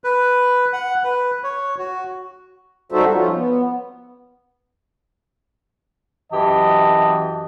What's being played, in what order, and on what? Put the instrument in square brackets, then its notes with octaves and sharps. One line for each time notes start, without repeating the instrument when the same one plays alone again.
[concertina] B4
F#5
B4
C#5
F#4
[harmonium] G3 D#4 F#4 A4 C5 E5
F3 C#4 F4
B3
[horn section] F#2 E3 G4 D#5 A5